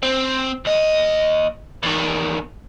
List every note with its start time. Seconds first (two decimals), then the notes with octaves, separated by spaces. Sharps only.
0.03 C4
0.65 D#2 D#5
1.83 E2 D#3